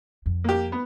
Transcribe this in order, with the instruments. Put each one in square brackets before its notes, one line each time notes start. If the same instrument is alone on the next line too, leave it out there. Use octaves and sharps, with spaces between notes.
[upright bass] F2
[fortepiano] A#3 G4
B3